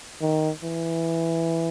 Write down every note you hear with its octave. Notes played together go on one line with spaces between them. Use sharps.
D#3
E3